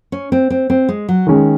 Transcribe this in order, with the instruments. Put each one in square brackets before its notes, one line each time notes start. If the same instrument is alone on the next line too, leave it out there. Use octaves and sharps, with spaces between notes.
[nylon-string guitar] C#4
C4
C4
C4
G#3
F#3
[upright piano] D#3 G#3 C#4